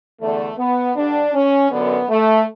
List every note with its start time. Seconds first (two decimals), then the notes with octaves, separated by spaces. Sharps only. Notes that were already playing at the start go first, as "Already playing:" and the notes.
0.22 E2 D3 A3
0.59 B3
0.96 G2 D3 D4
1.35 C#4
1.72 F#2 D3 B3
2.09 A3